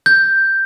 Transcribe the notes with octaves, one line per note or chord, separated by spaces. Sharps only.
G6